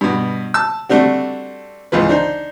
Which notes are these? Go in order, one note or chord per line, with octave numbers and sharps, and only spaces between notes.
G2 B2
A5 E6
G3 A3 C4 D4 F#4
G#1 C#2 E3 F4 B4
D4 D#4 C5